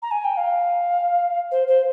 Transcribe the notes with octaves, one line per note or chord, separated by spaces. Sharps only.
A#5
G#5
G5
F5
C5
C5